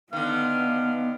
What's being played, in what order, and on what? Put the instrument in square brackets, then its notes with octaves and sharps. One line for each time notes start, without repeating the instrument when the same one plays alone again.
[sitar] D3 D#3 [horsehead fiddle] B3 [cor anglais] F5